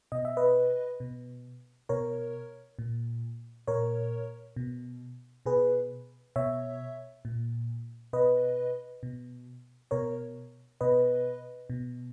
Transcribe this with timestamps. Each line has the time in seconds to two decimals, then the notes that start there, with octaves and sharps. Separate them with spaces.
0.12 B2 D#5
0.25 E5
0.37 B4 D#5
1.00 B2
1.89 B2 A#4 C#5
2.79 A#2
3.68 A#2 A#4 C#5
4.56 B2
5.46 B2 G#4 B4
6.36 B2 C#5 E5
7.25 A#2
8.13 B2 B4 D#5
9.03 B2
9.91 B2 A#4 C#5
10.81 B2 B4 D#5
11.70 B2